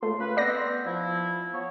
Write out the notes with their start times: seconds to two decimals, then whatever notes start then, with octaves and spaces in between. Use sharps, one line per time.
0.03 C#2 A3 F4 C6
0.20 A#3 C#4 B4
0.37 B3 C4 D5 A#6
0.86 F3 E4
1.54 F3 B3 C#5